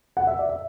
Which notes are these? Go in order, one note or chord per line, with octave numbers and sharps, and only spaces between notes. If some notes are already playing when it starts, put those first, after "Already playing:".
F#5
E5
D5
E5